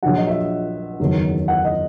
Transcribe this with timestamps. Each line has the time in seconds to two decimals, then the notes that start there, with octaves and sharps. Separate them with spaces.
0.03 A#1 A#2 F#3 F#5
0.17 D#5
0.27 E5
1.00 F#1 E2 D#3 F#3
1.48 F#5
1.64 D#5